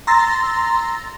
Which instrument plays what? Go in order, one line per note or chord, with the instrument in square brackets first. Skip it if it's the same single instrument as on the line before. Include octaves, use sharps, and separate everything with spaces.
[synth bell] A#5 C6 E6 A6 A#6